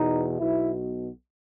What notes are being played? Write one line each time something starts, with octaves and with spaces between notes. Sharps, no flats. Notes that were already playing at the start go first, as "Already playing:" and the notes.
Already playing: E2 B2 D#4
B1 B2 E4